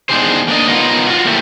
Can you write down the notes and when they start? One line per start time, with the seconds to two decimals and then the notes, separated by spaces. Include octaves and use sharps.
0.09 E2 D4 D#4 G4 G#4 C5
0.48 A#3 D4 A#4 D#5
0.68 B3 D#4 F4 A#4
1.07 F4 F#4
1.25 F#3 A3 A#3 C4 E4 G4